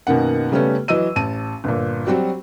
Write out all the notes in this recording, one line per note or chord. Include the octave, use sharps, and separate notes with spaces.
F#2 B2 D#3 A#3 F#5
C#3 G3 A3 B3 C#4
E3 F#3 D#5 E6 D#7
A1 A5 D#7
G1 A#2
F#3 G3 C4 F#4